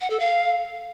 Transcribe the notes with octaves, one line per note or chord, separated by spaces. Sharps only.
F#5
A4
F5